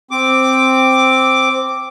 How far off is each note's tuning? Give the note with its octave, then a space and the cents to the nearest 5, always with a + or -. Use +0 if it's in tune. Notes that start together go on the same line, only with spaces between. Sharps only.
C4 +0 D6 +0